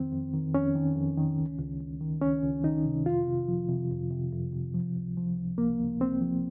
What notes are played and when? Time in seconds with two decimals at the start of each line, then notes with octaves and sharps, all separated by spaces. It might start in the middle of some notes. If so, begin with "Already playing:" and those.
Already playing: F2 D#3 C4
0.12 F2
0.33 D#3
0.54 F2 C#4
0.75 D#3
0.96 F2
1.17 D#3
1.38 C#2
1.59 C#2
1.81 C#2
2.00 D#3
2.21 C#2 C#4
2.43 C#2
2.63 D#3 D#4
2.85 C3
3.06 F2 F4
3.27 C3
3.48 F3
3.69 C3
3.91 F2
4.11 C3
4.32 F2
4.53 C3
4.74 F3
4.96 C#2
5.17 F3
5.37 C#2
5.58 C#2 A#3
5.80 C#2
6.01 C#2 C4
6.21 F3